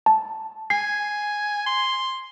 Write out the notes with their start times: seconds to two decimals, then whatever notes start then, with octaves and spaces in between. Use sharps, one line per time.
0.06 A5
0.70 G#5 C7
1.66 C6